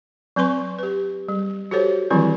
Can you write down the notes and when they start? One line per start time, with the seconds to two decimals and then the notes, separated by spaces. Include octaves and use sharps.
0.36 F#3 C4 B4 C6 C#6
0.79 G4 B4
1.28 G3
1.71 F#4 G4 A4 C5 C#5
2.10 D#3 E3 F#3 G3 C4 E4